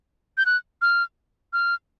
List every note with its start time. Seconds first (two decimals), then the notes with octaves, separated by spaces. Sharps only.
0.38 G6
0.46 F#6
0.82 F6
1.53 F6